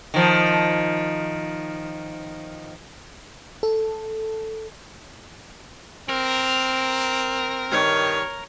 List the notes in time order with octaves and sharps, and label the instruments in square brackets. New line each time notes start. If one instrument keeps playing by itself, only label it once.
[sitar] D#3 F3
[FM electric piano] A4
[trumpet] C4 [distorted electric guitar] A#4
[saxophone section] G2 D#3 [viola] C#5